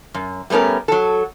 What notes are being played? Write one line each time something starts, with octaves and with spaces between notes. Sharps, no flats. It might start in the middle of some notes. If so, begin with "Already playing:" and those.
F#2
G3 A3 B3 C#4 A#4
F#3 A4